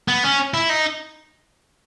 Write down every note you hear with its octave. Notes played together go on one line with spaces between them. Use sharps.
B3
C#4
E4
D#4